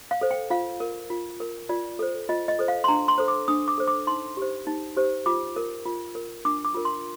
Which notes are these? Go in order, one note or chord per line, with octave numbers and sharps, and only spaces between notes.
F5
A4 C5
G5
F4 F5
A#4
F4
A#4
F4 D5
A4 C5
F4 D#5
D#5
A4 C5
F5
C6
D4 A#5
C6
A4 C5
D6
D4 D#6
D6
A4 C5
D6
D#4 C6
G4 C5
D#4
G4 C5
F4 D6
A#4
F4
A#4
D4 D6
D6
F4 A#4
C6